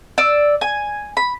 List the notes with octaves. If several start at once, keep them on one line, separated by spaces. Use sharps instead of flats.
D5 E6
G#5
B5